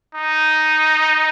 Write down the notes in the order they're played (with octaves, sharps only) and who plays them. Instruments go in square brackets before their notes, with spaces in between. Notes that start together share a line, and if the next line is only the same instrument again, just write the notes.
[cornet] D#4